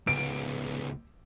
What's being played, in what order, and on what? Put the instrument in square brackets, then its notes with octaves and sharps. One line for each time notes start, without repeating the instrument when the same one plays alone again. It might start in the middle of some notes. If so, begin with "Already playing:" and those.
[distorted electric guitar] C#2 B3 [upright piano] D7